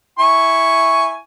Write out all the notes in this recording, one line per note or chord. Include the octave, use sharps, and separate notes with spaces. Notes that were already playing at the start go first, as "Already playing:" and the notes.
E4 G#5 C#6